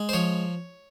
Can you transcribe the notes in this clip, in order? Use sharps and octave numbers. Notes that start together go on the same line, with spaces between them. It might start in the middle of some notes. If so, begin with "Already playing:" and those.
Already playing: G#3
C5
F3 C#5